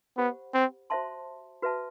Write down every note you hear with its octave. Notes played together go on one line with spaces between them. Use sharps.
B3 G4 C5 F#5 B5
C4
F#4 C5 E5 A5 C6
F#4 B4 E5 A5